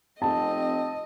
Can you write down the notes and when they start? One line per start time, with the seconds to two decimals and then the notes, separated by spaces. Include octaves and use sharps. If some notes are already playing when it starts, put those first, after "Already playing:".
0.22 F1 C4 D#5 A5